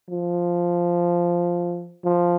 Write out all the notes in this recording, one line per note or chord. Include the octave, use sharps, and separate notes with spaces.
F3
F3